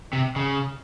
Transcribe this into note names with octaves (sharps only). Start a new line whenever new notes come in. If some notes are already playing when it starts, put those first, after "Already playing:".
C3
C#3